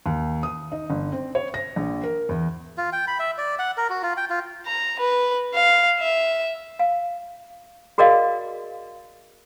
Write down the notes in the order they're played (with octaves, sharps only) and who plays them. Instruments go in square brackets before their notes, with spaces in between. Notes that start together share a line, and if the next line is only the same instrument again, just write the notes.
[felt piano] D#2
D#6
D#4
G1
C4
C#5
A#6
A#1
A#4
E2
[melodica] F4
G5
B5
E5
D5
F#5
A#4
F#4
F4
G5
F4
[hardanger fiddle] A#5
B4
F5
E5
[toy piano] F5
F#4 G#4 A#4 D5 D#5 F5